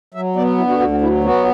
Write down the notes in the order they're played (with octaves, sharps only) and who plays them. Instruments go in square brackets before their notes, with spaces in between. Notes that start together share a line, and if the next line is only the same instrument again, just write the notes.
[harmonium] F#3 E5
B3 D5
D3 E4
F#4
D2 F#4
F#4
F#3 E4
B3 F#4